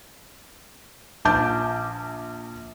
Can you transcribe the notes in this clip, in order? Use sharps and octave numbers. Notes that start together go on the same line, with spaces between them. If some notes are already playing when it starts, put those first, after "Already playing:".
A#1 A5 D6 G6